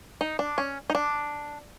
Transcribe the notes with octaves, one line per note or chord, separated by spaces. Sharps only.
D#4
D4
C#4
D#4
D4